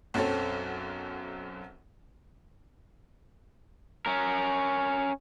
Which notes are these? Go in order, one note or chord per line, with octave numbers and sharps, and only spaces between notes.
B1 F#2 C4 A4 C#5
C#4 A#4